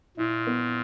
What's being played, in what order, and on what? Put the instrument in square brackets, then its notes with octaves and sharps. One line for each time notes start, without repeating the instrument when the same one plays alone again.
[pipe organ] A#2 [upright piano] E4
[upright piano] B3